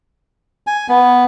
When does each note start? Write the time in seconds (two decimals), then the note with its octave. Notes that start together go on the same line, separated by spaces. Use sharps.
0.67 G#5
0.89 B3